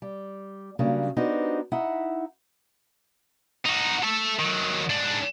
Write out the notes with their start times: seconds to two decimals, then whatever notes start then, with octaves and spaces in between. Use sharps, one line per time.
0.02 G3
0.79 C#3 F#3 G3 A#3 C#4 D4
1.16 B3 D4 D#4 F#4 G4 C5
1.72 D#4 E4 E5 F#5
3.65 D#4 F#4
4.03 A4 E5
4.39 D#3 F#3
4.90 G#2 D4